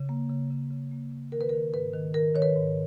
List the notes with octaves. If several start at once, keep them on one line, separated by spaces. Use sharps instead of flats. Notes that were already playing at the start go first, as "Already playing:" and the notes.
Already playing: C#3
A#3
C#3
C#3
C#3
A#3
C#3
D#3 A#4
B4
A#4
D#3
G#2 B4
D#3
D#3 A#4
D#3 C#5
B4
G#2